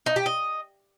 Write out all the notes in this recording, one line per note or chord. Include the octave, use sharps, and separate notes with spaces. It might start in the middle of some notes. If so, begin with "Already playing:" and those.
D#4
G4
D#5